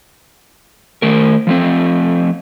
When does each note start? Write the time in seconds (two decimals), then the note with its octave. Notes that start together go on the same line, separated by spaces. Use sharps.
1.02 D#3 A3 A#4
1.47 F3 A3 C4